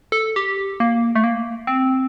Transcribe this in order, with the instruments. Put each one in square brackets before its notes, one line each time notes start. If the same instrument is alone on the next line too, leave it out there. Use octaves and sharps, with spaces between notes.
[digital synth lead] A4
G4
A#3
A3
A#3
C4